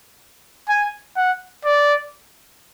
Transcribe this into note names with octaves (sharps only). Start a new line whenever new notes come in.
G#5
F#5
D5